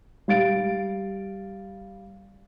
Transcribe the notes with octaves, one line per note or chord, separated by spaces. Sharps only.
G3 F5 A6 D7